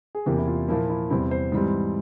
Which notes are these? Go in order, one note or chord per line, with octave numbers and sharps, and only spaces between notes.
G#4
E2 C3 E3 A#3 G4
E4
F4
A#2 F3 A#3 E4
E4
E2 C3 G3 C4 E4
C5
G#2 E3 G3 C4